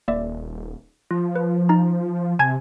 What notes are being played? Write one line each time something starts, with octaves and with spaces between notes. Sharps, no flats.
D#1 A#3 D5 E5
F3 F4
B4
D#4 A#5
C3 G#5 A5 G#6